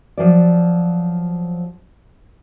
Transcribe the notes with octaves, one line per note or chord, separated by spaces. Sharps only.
F3 F#3 D5